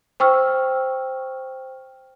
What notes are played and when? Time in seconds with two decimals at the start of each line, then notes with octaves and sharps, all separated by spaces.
0.20 C5 G5 C#6 E6 F6